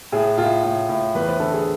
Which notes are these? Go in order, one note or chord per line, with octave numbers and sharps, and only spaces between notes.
A2 G#4
A2 F4
A2
A2
E2 B4
C5
D3 A4
G#4